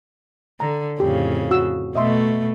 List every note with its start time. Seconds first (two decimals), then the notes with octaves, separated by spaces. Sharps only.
0.60 D3 A#5
1.00 F2 A2 C#3 G4
1.51 F#4 E6
1.95 B2 A3 D#5 E5 C6